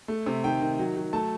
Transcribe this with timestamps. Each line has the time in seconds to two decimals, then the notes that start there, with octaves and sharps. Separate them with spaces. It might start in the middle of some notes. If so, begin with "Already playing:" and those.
0.08 A3
0.26 C3
0.44 D#3 G5
0.61 D#3
0.79 F#3
0.97 F#3
1.13 A3 A5